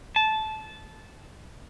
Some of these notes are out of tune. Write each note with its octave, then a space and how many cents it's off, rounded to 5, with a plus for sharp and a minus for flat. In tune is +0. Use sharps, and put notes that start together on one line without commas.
A5 -15